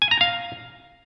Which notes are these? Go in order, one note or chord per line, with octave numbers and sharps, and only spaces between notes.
G#5
A#5
F5